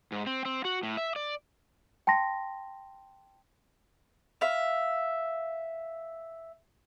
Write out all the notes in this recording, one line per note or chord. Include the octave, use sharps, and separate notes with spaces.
G#2
C4
C4
F#4
A2
E5
D5
G5 A5 C6 A#6
E5 F5